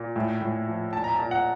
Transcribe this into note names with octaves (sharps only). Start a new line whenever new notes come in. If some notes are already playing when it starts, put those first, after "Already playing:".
Already playing: A#2
A2
A2
F3
A#2 A5
A#5
A5
A#2
F#5